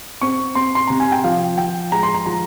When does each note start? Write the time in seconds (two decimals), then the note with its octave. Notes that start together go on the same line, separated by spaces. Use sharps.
0.21 C4 C#6
0.55 C4 C6
0.75 C6
0.87 C3 A#5
1.00 G#5
1.12 G5
1.24 F3 F5
1.58 F3 G5
1.92 G#3 A#5
2.03 C6
2.14 A#5
2.26 F3 A#5